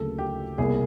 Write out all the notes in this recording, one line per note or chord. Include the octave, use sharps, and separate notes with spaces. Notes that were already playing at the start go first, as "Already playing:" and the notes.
Already playing: D2 C#3 F#3 A#3 A4
G4
C2 B2 G3 A#3 G#4